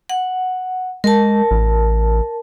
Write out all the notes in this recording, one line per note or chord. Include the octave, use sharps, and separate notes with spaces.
F#5
G#3 A#4 A5
A1